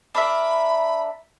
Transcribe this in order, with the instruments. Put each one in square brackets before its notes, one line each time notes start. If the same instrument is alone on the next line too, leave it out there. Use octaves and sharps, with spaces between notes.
[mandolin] D4 A#4 E5 [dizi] B5